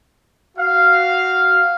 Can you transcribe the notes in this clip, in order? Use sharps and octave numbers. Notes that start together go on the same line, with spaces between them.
F#4 F5